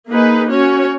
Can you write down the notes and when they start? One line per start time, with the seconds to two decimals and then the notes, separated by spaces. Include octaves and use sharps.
0.10 A#3 D#4 G#4 B4
0.50 C#4 F#4 C#5